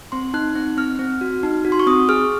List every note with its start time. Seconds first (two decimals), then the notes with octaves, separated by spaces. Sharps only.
0.12 C4 C6
0.34 D#4 F#6
0.56 C4 F#6
0.77 C4 F6
0.99 C4
1.21 F#4
1.43 D#4
1.65 F#4
1.72 C6
1.80 C#6
1.87 C4 D#6
2.09 G#4 F6